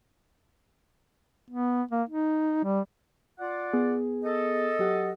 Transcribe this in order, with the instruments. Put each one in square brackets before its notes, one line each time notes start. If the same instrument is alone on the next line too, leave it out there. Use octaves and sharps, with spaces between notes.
[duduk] B3
A#3
D#4
G3
[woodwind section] F4 D5 F#5
[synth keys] B3 G#4
[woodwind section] A4 D#5
[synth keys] F#3 G4 F#5